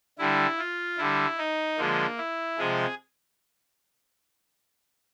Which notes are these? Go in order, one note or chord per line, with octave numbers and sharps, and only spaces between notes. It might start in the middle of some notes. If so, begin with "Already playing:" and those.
D3 G3 E4
F4
D3 G3 E4
D#4
D3 F3 G#3 A#3
E4
C3 F3 G#3 G#4